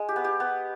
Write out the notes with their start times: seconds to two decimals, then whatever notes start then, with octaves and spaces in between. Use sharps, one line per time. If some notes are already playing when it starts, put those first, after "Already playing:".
Already playing: G#3
0.09 G4
0.16 B3
0.24 G4
0.40 B3